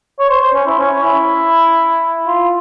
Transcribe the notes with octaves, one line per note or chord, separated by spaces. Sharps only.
C#5
C5
C5
C#4
E4
C#4
E4
F4